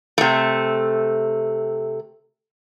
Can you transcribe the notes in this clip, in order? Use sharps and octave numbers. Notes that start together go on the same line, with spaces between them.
C3 A3